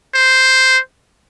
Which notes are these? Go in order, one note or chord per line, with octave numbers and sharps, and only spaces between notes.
C5